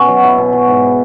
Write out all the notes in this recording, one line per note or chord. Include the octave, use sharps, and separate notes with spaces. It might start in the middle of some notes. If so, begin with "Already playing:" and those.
Already playing: B2 C#4 F#4
F#3
F#3 E4
B2
F#3
G#2